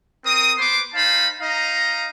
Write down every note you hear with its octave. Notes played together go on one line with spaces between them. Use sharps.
C4 A#4 D#6
B3 B4 C5 C6 D6
D#4 C5 F5 A5 B5
D#4 D#5 F5 A#5